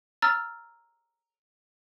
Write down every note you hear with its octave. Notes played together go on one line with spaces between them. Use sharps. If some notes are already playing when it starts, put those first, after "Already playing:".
A#5 E6 F6 A6